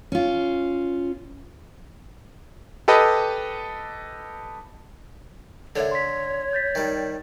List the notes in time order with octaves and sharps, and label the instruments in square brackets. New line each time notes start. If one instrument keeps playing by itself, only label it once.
[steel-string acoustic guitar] C#4 F4
[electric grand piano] G4 A4 B4 D#5
[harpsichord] D3 [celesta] A4 A#4 E5 [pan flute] C#5
[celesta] C6 B6
G6 A6 B6
[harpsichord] D#3 G3